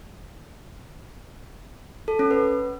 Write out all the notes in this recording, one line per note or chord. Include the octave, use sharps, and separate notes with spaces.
A4
C#4
B4